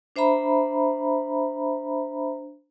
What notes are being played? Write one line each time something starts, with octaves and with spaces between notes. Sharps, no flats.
D4 C5 E5 A#5 B5